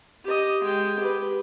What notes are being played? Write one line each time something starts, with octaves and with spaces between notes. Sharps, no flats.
G4 D#5
G#3 G5
G4 B4